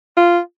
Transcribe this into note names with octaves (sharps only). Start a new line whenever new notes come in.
F4